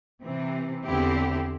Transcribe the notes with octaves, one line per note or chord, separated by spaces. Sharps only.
C3 E3 C4
E2 D3 C4 E4 G4